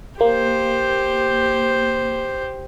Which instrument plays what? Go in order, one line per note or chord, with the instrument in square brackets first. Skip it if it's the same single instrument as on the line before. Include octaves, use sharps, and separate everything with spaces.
[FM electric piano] A#3 [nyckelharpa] G4 C5